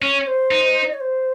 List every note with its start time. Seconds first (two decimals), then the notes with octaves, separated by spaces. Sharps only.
0.02 C#4 C#5
0.27 C5
0.51 D#4
0.86 D#5
0.93 C#5
1.01 C5